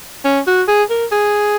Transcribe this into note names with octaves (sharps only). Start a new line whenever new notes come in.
C#4
F#4
G#4
A#4
G#4